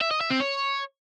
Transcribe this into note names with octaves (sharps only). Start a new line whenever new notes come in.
E5
D#5
E5
C4
C#5